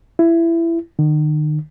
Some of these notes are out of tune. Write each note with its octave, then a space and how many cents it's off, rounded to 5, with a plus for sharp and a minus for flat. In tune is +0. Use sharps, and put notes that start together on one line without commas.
E4 +20
D#3 -40